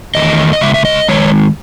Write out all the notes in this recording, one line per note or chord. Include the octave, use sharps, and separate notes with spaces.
E2 D#3 A3 D#5
D#5
C#3 G#3 E5
E5
D#5
D#3 G#3 C#5